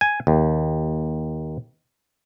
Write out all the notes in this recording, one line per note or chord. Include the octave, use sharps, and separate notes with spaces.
G#5
D#2